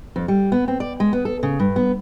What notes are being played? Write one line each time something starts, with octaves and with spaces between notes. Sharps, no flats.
F2
G3
B3
C4
D5
G#3
B3
A4
C#3
G2
B3